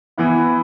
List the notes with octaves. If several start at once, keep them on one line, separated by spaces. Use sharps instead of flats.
E3 B3 E4